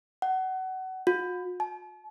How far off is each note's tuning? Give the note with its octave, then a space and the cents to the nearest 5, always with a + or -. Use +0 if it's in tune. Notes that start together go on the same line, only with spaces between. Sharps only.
F#5 +25
F#4 -45
A5 -40